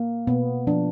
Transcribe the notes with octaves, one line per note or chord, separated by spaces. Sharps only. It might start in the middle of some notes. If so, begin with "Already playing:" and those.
Already playing: A#3
B2 B3
F3 D4